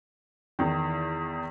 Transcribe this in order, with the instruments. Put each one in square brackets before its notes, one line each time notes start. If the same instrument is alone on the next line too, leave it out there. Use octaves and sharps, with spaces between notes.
[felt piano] E2 D#3